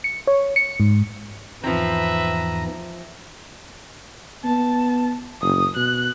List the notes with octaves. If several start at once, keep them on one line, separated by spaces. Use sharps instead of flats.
C#7
C#5
C#7
G#2
E2 G#2 E3 F3 C4 B4 E5 A#5
B3 A5
F#1 D#6
B2 F#6